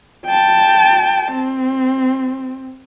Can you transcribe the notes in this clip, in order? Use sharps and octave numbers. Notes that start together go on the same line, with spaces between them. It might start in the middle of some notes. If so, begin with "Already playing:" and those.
G5 A5
C4